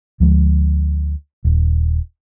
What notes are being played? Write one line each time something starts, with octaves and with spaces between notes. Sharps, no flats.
D2 F3 G#3
D#1